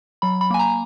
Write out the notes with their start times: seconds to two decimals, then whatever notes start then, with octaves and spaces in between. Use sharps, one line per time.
0.22 F#3 B5
0.41 B5
0.50 A#3 G#5
0.59 A#5